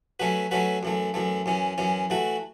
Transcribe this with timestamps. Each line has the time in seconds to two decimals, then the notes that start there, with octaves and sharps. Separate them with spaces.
0.20 F#3 A3 C#4 F#4 B4
0.51 F#3 A3 C#4 F#4 B4
0.83 F#2 E3 A3
1.14 F#2 E3 A3
1.46 F#2 E3 C#4
1.78 F#2 E3 C#4
2.10 E3 A3 F#4